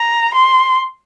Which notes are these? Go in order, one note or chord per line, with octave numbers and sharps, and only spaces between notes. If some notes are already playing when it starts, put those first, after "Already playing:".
Already playing: A#5
C6